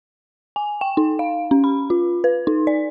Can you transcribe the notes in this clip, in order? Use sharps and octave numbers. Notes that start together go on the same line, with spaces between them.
G#5
G5
D#4
F5
C#4
B5
F4
B4
D#4
D5